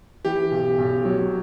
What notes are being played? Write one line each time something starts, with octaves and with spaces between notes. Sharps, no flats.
E3 G4
B1
B1
F#3